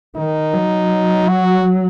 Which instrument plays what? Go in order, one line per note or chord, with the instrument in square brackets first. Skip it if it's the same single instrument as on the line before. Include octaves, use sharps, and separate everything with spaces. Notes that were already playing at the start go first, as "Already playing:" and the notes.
[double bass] D#3 [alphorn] D#4
[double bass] F#3
[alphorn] F#4